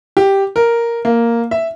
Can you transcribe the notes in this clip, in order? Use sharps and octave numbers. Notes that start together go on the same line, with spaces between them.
G4
A#4
A#3
E5